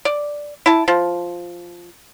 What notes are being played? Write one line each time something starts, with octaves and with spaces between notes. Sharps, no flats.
D5
E4 A5
F3